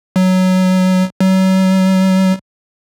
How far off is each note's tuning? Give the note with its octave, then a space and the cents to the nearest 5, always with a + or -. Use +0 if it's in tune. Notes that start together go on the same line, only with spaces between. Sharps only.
F#3 +5
F#3 +35